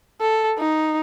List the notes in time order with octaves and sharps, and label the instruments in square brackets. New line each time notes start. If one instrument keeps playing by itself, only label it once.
[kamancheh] A4
D#4